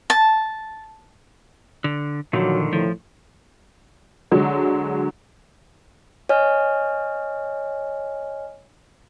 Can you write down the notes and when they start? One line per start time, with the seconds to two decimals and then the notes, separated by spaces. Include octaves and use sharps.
0.10 A5
1.84 D3
2.33 A#2 D3 D#3 F3 F#3
2.73 A2 F3
4.31 D3 F#3 G#3
6.29 C#5 D#5 G#5 F6